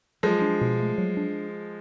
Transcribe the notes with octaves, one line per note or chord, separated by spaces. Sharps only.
F3 F#3 G#3
D4
B2
A3
F#3
D4